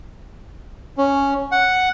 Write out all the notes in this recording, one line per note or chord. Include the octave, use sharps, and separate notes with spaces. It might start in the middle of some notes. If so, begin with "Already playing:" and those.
C#4
F#5